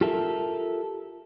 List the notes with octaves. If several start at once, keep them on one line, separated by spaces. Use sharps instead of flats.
F4 G4 A4 A#4 E5